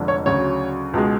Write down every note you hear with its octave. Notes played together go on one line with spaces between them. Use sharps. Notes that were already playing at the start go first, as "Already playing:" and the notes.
Already playing: F1 F2 D3 F3 G#3
C#5
D2 C#3 F#3 C#5
C#2 B2 G#3